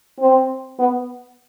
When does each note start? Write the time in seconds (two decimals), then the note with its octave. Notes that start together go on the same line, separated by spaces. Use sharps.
0.20 C4
0.79 B3